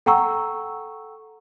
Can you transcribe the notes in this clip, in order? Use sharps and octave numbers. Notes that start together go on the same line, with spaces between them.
A4 F#5 G5 A#5 C#6 E6